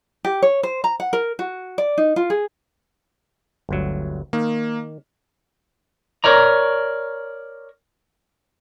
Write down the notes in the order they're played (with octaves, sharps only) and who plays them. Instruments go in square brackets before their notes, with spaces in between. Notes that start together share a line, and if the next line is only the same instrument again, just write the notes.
[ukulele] G4
C#5
C5
A#5
F#5
A#4
F#4
D5
D#4
F4
G#4
[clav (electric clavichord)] G1 D2 F#3
[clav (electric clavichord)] D#3 [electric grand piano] A#3
[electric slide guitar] A#4 C#5 D5 A#5